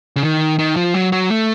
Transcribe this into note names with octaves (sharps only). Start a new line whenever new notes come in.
C#3
D#3
D#3
F3
F#3
F#3
A3